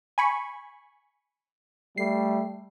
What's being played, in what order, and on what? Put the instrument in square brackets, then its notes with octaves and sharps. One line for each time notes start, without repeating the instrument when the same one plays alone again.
[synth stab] G#5 B5 C#6
[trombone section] G3 A3 [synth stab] C7